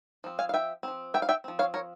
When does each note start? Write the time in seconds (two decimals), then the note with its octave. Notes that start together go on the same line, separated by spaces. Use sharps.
0.24 F3 C4
0.39 F5 G#5
0.49 F5
0.54 E5 G5
0.83 F3 C4
1.14 E5 G5
1.22 F5
1.29 E5 G5
1.44 F3 C4
1.59 C#5 F5
1.74 A#4 C#5